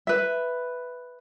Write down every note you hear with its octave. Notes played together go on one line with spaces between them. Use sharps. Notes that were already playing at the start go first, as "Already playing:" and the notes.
B4 E5